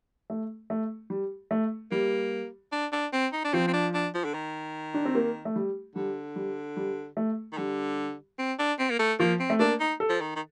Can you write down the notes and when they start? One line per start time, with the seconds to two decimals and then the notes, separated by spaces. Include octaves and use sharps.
0.30 A3
0.70 A3
1.10 G3
1.51 A3
1.91 G3 A#3
2.72 D4
2.92 D4
3.13 C4
3.33 D#4
3.44 D4
3.53 F3 C4
3.68 C4
3.73 D4
3.94 D4
4.14 F3
4.25 D3
4.34 D#3
4.94 D4
5.05 C4
5.15 A#3
5.45 A3
5.56 G3
5.96 D3 G3
6.36 G3
6.77 G3
7.17 A3
7.52 D#3
7.58 D3 G3
8.39 C4
8.59 D4
8.79 C4
8.90 A#3
8.99 A3
9.20 F3 A#3
9.40 C4
9.50 A3
9.59 A#3 D4
9.80 D#4
10.00 A4
10.09 F3
10.21 D#3
10.36 D#3